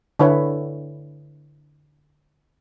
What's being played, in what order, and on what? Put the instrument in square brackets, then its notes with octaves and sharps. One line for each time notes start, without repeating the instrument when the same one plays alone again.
[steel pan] D3 E4 B4 C#5